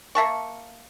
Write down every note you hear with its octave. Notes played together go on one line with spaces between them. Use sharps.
A#3 E5 A5 C#6